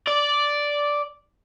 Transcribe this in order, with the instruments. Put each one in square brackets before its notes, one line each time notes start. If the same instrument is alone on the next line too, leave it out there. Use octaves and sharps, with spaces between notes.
[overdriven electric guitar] D5